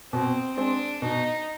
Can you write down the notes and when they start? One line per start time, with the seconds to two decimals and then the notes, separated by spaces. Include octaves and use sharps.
0.12 B2 C4
0.57 G#3 C4 D4
1.02 B2 D#4